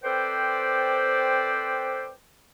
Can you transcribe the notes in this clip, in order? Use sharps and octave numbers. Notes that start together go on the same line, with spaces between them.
C4 A4 B4 C5 D5 G5